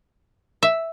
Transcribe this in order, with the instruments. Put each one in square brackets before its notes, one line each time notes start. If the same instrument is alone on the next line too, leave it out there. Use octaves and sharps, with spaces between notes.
[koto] E5